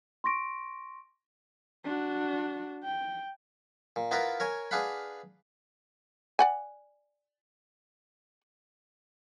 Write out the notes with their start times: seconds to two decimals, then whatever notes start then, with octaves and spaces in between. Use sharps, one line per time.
0.24 C6 C#6 A#6 D7
1.84 D4 F#4
2.84 G5
3.96 A#2
4.11 B3 E4 F4 A#4 B4
4.40 A#4 C#5 G#5
4.71 D4 G#4 B4 F5 F#5 B5
6.39 D5 F#5 G#5